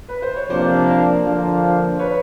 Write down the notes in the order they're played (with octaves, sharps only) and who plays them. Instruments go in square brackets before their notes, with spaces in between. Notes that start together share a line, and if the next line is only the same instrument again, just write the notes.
[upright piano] B4
C5
C#5
[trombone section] C3 F3 A#3 D4 [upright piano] C5 D5
[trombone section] D3 F3 A#3 D4
[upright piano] B4 C#5